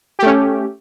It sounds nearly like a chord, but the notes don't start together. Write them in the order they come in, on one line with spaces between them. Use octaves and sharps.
G4 A3 C#4